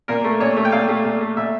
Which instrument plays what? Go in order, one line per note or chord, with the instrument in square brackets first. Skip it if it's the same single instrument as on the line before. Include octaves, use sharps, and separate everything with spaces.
[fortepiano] A#2 A#4
A3
A#2 C#5
A3
G5
A#2 F5
A3
A#2
A3
A#2 E5